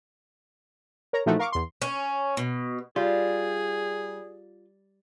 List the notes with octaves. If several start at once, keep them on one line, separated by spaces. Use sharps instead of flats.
A#4 C#5 A#5
A#2 E3 F3 A3 D#4 F#4
A#4 F5 C#6 D6
E2 C6
C#4
B2
G3 F4 G#4